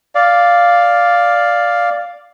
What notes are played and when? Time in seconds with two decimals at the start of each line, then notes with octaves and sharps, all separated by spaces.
0.15 D5 F5